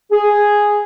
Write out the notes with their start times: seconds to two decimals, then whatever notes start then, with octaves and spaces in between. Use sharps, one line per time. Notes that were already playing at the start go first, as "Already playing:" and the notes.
0.12 G#4